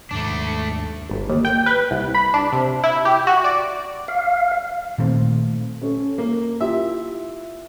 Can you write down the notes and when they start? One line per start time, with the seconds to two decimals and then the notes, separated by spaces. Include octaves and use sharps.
0.11 D#2 G#2 A3 D4
1.10 G1
1.29 D#2
1.45 G5
1.66 B4
1.91 C2
2.14 B5
2.34 D4
2.52 C3
2.84 E4
3.05 G4
3.27 F#4
3.44 D5
4.08 F5
4.98 A#2 D#3 A3 C4
5.82 C#4 A4
6.18 A#3
6.60 E4 F4 G4 E5